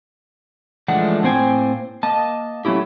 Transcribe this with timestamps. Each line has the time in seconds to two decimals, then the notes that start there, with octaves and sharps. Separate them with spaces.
0.88 E3 F3 G#3 A3 D4 F#5
1.23 A2 A#3 C4 C5 G5 G#5
2.03 A#3 D#5 A5
2.65 F#3 A3 C#4 E4 G4